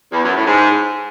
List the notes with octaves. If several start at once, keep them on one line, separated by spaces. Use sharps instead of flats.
E2
F#2
A2
G#2